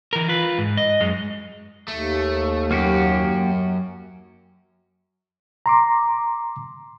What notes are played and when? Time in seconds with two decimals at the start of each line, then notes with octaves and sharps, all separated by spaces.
0.13 E3 A#4
0.28 F4 B4
0.58 G#2
0.77 D#5
1.00 F#2 G#3
1.88 D#2 A3
2.71 F#2 A#3 F#4 G4
5.66 A#5 C6 D6